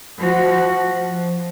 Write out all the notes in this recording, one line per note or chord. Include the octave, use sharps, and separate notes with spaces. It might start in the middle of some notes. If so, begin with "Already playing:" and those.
F3 F#4
F3